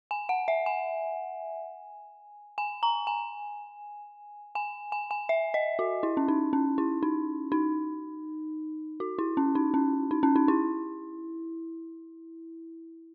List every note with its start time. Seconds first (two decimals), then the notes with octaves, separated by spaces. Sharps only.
0.11 G#5
0.29 F#5
0.48 E5
0.66 G#5
2.58 G#5
2.83 A#5
3.07 G#5
4.55 G#5
4.92 G#5
5.11 G#5
5.29 E5
5.54 D#5
5.79 F#4
6.03 E4
6.17 C#4
6.28 D#4
6.53 C#4
6.78 E4
7.03 D#4
7.52 D#4
9.00 F#4
9.19 E4
9.37 C#4
9.55 D#4
9.74 C#4
10.11 D#4
10.23 C#4
10.36 D#4
10.48 E4